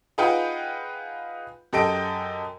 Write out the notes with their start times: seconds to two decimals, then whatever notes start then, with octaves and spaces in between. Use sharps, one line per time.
0.18 D#4 F4 G#4 B4 F#5 G5
1.73 F#2 G4 A4 D#5 G5 D7